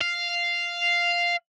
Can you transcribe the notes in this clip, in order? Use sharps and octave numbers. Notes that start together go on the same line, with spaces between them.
F5